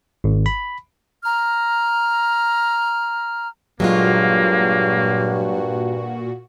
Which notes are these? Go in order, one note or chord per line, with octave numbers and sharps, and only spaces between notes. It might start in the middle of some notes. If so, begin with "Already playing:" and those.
G#1
B5
A#5 F6
G2 A#2 F#3 G#3 A#3 F4 F#4